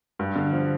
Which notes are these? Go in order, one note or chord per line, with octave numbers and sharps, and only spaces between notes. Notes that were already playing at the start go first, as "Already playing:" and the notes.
G2
D3
F3